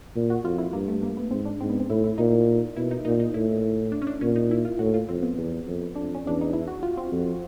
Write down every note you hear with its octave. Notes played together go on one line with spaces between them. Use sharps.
A#2
F#4
F2 F4
E4
G2 A#3
A3
A#3
B3
G#2 C4
D4
G#2 C4
B3
C4
A2 E4
E4
A#2 D#4
B2 E4
D#4
A#2 D#4
D#4
A2 E4
D4
C#4
D4
A#2 C#4
D#4
E4
F4
A2 F#4
F4
F2 C4
B3
E2
F2
F2 D4
C#4
E2 D4
D#4
E4
F#4
F4
C4
F2